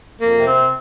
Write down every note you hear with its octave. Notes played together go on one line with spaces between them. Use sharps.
F2 A#3
C3
C4